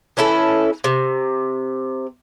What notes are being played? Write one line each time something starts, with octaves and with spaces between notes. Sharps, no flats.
E3 C#4 E4 A4
C3